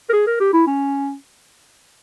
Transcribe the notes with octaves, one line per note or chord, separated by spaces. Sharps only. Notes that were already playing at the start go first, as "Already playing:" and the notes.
A#4
G#4
A#4
G4
E4
C#4